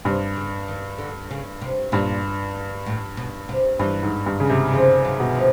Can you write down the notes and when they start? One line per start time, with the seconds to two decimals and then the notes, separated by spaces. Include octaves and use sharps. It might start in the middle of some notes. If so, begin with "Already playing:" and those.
0.05 G2 C3
0.36 C#3
0.68 D#3
0.98 D3
1.30 C#3
1.61 C3
1.92 G2 A#2
2.86 A2
3.17 B2
3.49 C3
3.79 G2 E3
4.03 G#2
4.26 G2
4.40 C#3
4.50 C3
4.73 C#3 F3
5.05 F#3
5.20 B2
5.35 F3